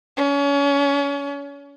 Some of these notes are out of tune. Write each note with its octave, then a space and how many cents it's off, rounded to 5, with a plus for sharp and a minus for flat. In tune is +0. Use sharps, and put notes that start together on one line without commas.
C#4 +30